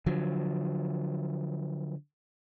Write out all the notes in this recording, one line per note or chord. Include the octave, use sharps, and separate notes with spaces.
D3 F3 F#3